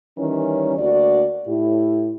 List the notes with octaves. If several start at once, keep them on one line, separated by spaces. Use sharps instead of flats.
D#3 E3 G3 C#4
D2 A#3 F#4 D5
A2 E4 G4